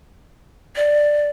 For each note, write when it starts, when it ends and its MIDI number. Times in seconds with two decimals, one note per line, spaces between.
0.76 1.29 74